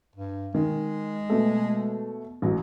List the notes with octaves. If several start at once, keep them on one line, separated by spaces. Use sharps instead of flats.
G2
D#3 G#3
B2 A3
A1 F#3